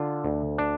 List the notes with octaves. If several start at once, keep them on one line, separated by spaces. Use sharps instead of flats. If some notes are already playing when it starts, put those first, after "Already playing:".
Already playing: D3 F4
D2
D4